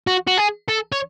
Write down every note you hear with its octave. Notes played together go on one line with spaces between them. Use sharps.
F#4
F#4
G#4
A4
C#5